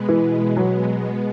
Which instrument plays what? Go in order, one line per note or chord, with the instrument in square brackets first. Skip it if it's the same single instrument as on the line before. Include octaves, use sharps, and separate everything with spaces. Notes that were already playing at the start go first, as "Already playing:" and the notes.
Already playing: [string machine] B2 G#3 B3
[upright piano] E3
F#3